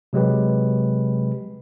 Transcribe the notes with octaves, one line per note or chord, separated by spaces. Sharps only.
C3 F#3 G#3 G4 B4